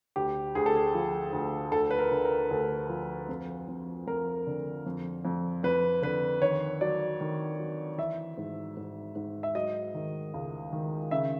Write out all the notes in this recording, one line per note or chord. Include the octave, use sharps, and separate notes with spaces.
D2 G4
D2 G#4
A4
G#4
F3
D2
D2 A4
B4
A#4
D3
A#4
D2 A4
F3
F2
F2
F2 A#4
D3
F2
F2
F2 B4
D3 B4
D#3 C#5
F#3 D5
D#3
F#3
E3 E5
G#2
G#2
G#2
E5
F#3 D#5
D#3
C#2
D#3
C#3 E5